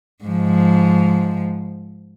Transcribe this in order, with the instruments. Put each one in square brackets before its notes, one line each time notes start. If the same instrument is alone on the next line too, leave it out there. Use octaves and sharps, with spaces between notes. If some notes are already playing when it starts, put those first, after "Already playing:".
[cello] G#2 F3